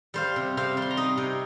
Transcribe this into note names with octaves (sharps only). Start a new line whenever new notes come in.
G3 C5 F5
C3
C3 C5 F5
G3
C6
A#5
D#4 D#5 G5
C3